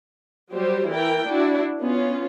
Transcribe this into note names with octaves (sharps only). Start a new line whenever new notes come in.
F#3 G3 G4 C5
E3 E4 A#4 G5
D4 E4 F#4
B3 C#4 F4